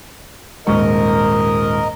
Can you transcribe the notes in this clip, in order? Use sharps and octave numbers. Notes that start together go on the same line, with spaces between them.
D#1 G#2 A#4 D#5 C#6